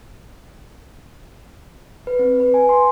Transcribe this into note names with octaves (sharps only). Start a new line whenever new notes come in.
B4
C4
B4
G#5
C6